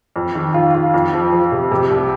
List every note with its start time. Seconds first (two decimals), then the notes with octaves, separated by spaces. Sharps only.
0.16 F2
0.35 D#3
0.54 F4
0.74 F4
0.94 F2
1.13 F3
1.32 F3
1.52 C3
1.71 C3
1.90 C2